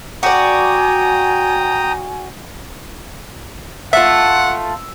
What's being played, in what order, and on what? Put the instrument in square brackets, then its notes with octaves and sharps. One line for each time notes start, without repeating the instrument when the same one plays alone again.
[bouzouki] F#4 D5 [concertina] G5 A#5 D#6 [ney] G#5
[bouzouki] A3 F4 [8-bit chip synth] E5 [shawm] F#5 [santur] E6